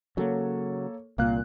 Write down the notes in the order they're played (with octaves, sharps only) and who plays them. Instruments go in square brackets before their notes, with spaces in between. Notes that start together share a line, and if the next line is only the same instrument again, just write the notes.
[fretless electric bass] C#3 F#3 [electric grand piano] A#3 A4 C#5
[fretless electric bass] C2 A#2 [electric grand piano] A#3 F5 F#6